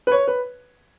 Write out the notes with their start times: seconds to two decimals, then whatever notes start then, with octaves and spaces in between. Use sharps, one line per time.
0.07 B4
0.12 C#5
0.28 B4